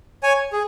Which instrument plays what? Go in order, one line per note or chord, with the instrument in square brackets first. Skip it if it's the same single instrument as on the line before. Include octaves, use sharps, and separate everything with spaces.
[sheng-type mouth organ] C#5 G#5
G#4